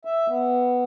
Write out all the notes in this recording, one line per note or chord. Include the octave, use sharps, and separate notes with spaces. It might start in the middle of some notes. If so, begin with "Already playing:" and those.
E5
B3